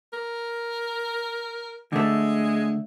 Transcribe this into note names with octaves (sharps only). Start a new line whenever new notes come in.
A#4
D3 G#3 A3